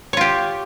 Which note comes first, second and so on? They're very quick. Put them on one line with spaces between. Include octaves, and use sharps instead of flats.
C#5 F4 G4